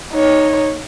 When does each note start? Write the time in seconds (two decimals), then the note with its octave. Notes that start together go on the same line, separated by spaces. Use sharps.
0.13 D#4 C#5